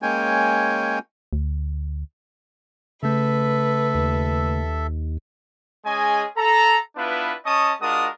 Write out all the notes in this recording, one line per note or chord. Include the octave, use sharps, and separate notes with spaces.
G#3 A#3 C#4 C#5 G5 G#5
D2
C#3 A3 A4 B4 E5
D#2
G#3 C#4 G#4 D#5 G#5
A4 A#5
B3 D4 E4 F4 B4
C#4 D#5 A5 C#6 D#6
G#3 D4 F4 F#4 A#4 D#6